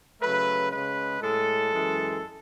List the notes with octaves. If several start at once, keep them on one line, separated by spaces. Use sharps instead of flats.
C#3 F#3 A3 B4
C#3 G#3 B4
A2 G#3 A4
F#2 E3 G#3